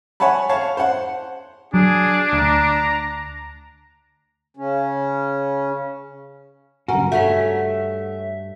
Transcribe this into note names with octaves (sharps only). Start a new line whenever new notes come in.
C#5 F#5 G#5 A5 B5
C#5 F5 A5
C5 F#5
F#3 D4 G#4
D2 A#5
C#3 C#4
F#1 G2 C#4 F#4 A#4
G2 A3 C#4 F#4 E5